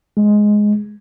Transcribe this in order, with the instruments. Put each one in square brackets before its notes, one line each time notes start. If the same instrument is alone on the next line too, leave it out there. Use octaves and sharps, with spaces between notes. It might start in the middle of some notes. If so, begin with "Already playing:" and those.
[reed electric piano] G#3